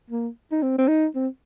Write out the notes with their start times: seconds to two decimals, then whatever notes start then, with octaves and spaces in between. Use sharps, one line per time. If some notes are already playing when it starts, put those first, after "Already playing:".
0.10 A#3
0.52 D#4
0.62 C4
0.78 C4
0.88 D#4
1.15 C4